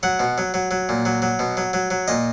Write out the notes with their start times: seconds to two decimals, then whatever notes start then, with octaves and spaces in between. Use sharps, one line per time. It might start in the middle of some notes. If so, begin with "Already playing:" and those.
0.03 F#3 F#5
0.19 B2
0.38 F#3
0.54 F#3
0.71 F#3
0.89 A#2
1.05 F#3
1.22 F#3
1.39 B2
1.57 F#3
1.73 F#3
1.90 F#3
2.08 A#2 D#5